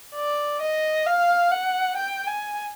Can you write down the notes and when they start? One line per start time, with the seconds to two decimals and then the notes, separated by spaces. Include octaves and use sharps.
0.16 D5
0.62 D#5
1.06 F5
1.51 F#5
1.97 G5
2.27 G#5